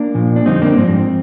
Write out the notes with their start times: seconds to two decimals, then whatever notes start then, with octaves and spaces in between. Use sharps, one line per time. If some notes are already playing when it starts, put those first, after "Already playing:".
Already playing: A#3 D4
0.14 A#2 F3
0.36 D4
0.45 F2 D3 G3 C4 D#4
0.62 A#3 D4
0.77 G#2 F3 C4